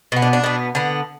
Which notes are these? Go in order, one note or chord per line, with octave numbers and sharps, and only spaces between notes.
B2 B3
D4
D4
B2 B3
D3 B3